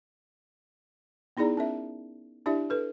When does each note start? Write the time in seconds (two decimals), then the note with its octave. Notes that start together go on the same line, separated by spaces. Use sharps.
1.37 B3 D#4 E4 G#4 D5 A#5
1.57 C#4 A#4 E5
2.46 D4 E4 G4 D5 E5
2.70 A4 B4